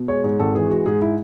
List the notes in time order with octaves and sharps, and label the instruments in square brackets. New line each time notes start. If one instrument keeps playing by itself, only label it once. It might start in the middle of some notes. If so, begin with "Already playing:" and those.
Already playing: [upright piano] B2
G#3 C#5
G#2 C#5
G#1 A4
E3 G#4
G#3 F#4
G#2 G#4
E4